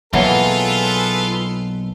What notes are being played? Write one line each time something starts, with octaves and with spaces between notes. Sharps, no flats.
B1 E3 F#3 A#3 F4 G#4 A4 B4